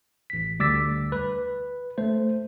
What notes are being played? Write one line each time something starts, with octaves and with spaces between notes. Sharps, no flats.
A1 B6
D2 G3 D6 E6 A6 B6
B4
A3 C5